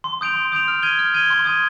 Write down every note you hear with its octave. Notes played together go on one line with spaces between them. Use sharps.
C6
D#6 G6 D7 F7
C6
D#6 G6 D7 F7
F6
G#6 D#7 G7
F6
G#6 D#7 G7
C6
D#6 G#6 D#7